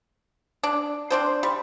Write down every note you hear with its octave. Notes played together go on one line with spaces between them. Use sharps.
D4
C4 D4 C5
G3